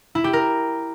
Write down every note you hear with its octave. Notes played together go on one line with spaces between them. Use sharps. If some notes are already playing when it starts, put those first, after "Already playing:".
E4
G4
A#4